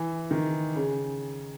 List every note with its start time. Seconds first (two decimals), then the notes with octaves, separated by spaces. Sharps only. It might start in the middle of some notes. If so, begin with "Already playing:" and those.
Already playing: E3
0.31 D#3
0.76 C#3